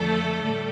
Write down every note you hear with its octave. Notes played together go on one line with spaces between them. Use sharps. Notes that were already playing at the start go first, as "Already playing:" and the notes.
Already playing: F2 D3 F3 A3 A4
A2 G3